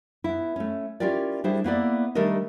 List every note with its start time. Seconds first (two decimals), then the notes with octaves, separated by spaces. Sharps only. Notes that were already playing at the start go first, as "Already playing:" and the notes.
0.24 B3 E4
0.56 A3 C#4
1.00 C#4 E4 F4 G4 A#4 D5
1.44 G3 D4 E4 G#4 C5
1.64 A#3 B3 E4 D5
2.15 D#3 G3 A3 D4 A#4 D#5